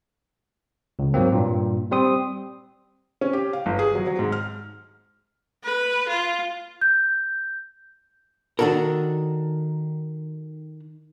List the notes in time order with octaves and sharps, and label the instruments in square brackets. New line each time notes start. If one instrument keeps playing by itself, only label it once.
[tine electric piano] C#2
G#2 F#3 A#3 C4
G2 A#2
G3 C4 C6 D#6
[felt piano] C#4
G4
F5
G1
G#4
F#3
F#3
G#2
F6
[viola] B4
F4
[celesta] G6
[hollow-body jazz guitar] D#3 D4 F#4 A4 A#4